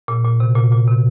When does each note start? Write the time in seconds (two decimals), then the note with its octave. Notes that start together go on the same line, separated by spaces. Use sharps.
0.08 A#2
0.24 A#2
0.40 C3
0.56 A#2
0.71 A#2
0.88 C3